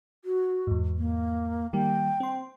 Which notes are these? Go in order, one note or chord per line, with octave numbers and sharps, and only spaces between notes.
F#4
E2 G#2
A#3
D#3 G3 A#3 G5
C4 C6